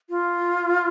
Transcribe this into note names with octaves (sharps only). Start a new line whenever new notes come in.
F4